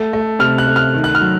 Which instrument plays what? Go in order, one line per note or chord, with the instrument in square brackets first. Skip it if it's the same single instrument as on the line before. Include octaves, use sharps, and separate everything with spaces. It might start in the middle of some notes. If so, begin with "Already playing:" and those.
Already playing: [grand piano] A3
A3
C3 F6
F#6
A3
F6
D#3
F#6
F6
F#3